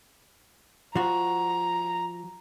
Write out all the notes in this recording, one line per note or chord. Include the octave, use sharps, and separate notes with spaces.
F3 F#4 A#5